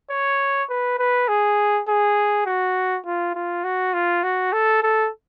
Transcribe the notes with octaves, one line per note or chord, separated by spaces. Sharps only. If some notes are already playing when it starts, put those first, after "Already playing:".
C#5
B4
B4
G#4
G#4
F#4
F4
F4
F#4
F4
F#4
A4
A4